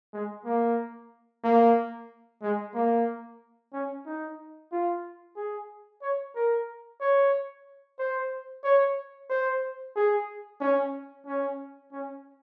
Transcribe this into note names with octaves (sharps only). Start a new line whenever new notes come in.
G#3
A#3
A#3
G#3
A#3
C#4
D#4
F4
G#4
C#5
A#4
C#5
C5
C#5
C5
G#4
C#4
C#4
C#4